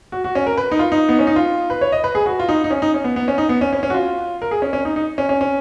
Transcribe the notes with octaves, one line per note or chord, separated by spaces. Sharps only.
F#4
F#4
C#4
A#4
B4
D#4
F4
D#4
B3
C#4
D#4
F4
B4
C#5
D#5
B4
G#4
F#4
F4
D#4
D#4
C#4
D#4
C#4
B3
B3
C#4
D#4
B3
C#4
C#4
C#4
F#4
F4
A#4
G#4
C#4
C#4
D#4
D#4
C#4
C#4
C#4